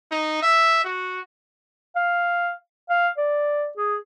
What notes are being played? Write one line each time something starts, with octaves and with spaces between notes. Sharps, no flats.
D#4
E5
F#4
F5
F5
D5
G#4